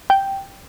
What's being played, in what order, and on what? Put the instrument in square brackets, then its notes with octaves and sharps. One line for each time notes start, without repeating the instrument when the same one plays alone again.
[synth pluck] G5